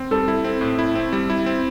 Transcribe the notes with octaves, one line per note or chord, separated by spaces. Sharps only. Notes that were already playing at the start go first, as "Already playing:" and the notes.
Already playing: C4
G3 A4
E4
C4
A2
E4
C4
G3
E4
C4